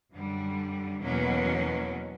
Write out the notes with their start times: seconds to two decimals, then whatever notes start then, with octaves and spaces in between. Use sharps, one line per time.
0.12 F#2 D3 G3
1.01 E2 B2 F#3 A#3 C#4